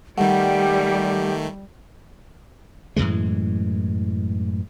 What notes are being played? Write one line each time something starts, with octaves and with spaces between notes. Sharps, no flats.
D#3 G3 A3 G4 F#5
F#2 A2 E3 G#3